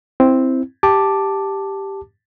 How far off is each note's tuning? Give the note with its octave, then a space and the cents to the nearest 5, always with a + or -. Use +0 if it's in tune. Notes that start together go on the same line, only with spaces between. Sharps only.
C4 +0 E4 +0
G4 +0 A5 +0 D6 +5